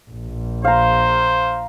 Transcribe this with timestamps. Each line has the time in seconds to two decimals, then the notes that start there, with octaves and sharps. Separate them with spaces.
0.11 A#1
0.65 C5 F5 A#5